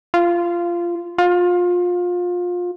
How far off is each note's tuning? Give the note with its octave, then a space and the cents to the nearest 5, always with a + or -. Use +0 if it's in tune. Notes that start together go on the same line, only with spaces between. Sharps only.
F4 -15
F4 +25